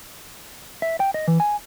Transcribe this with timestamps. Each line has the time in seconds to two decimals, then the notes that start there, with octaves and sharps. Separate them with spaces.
0.82 E5
1.00 G5
1.14 D#5
1.28 E3
1.40 G#5